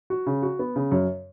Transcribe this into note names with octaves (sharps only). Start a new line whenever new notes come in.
F#4
C#3
F#4
B3
C#3
F#2